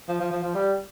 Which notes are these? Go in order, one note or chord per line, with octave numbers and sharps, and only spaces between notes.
F3
F3
F3
F3
G3